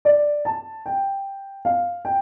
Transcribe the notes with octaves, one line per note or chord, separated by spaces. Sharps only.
D5
A5
G5
F5
G5